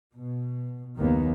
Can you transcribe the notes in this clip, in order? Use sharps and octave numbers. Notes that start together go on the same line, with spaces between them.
B2
F#1 D#2 D#3 A#3 B3